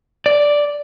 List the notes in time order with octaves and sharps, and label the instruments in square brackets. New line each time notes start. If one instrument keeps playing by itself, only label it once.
[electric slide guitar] D5